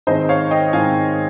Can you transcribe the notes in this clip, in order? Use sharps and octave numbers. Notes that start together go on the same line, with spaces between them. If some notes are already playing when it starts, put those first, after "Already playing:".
G#2 D#3 G#3 C4 C5 D#5
C#5 F5
D#5 G5
G#2 D#3 G#3 C4 F5 G#5